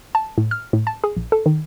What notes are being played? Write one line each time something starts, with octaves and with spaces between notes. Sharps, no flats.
A5
A2
F6
A2
A5
G#4
A#1
A4
D#3